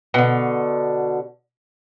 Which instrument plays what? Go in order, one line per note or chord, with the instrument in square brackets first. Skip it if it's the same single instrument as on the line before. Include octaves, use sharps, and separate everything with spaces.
[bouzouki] B2 D3